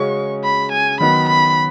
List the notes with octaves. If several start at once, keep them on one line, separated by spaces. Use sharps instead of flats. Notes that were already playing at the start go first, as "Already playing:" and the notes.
Already playing: C#3 G#3 C#4 F#4 C#6
B5
G#5
D#3 F#3 B3 B5
B5